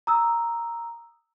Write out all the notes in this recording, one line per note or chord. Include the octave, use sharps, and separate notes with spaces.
A#5 D#6 E6